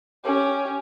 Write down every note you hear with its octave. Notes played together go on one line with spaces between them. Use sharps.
C#4 G4